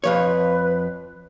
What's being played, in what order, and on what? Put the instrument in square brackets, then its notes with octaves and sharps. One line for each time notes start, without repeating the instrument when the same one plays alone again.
[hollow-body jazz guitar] F2 F3 C#5 [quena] B4